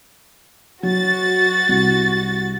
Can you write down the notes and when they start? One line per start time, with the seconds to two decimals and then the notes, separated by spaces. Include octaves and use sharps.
0.83 F#3 F#4 A6
1.69 C2